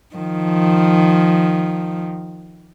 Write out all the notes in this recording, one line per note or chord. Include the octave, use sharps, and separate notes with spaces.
D#3 F3